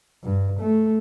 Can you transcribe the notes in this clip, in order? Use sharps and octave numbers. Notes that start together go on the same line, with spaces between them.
G2
A3